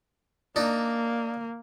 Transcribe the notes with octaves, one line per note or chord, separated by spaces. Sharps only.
A#3 D4 D#4